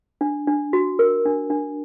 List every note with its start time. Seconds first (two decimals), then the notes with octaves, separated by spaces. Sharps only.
0.21 D4
0.47 D4
0.73 F#4
0.99 A#4
1.25 D4
1.50 D4